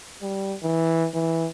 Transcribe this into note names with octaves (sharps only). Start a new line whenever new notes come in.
G3
E3
E3